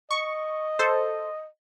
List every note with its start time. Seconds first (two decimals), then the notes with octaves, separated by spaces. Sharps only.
0.11 D#5 C#6
0.79 A4 C5